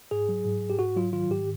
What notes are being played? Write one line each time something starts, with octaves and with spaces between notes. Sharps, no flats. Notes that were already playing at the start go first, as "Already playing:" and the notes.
G#2 G#4
F#3
G#2
G#2
G4
G#2 F#4
F#3 F4
D#3 F4
G#2 G4